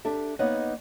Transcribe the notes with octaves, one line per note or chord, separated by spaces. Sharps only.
D4 G4 A4 E5
A#3 B3 D#4 C#5 D#5 F#5